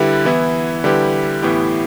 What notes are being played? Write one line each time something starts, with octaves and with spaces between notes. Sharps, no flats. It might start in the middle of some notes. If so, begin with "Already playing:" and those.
Already playing: D3 G3 E4 G4 B4
E3 B3 E4
D3 G3 E4 G4 B4
A2 E3 B3 E4 G4